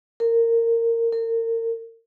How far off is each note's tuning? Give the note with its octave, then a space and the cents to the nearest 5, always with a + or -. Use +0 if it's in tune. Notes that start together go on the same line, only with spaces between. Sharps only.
A#4 -20
A#4 -35